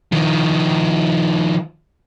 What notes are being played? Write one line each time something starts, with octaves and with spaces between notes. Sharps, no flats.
D#3 F3